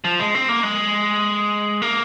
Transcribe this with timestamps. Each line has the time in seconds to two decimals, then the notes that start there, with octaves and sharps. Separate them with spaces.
0.04 F3
0.19 G#3
0.35 C4
0.49 A#3
0.63 G#3
1.82 A#3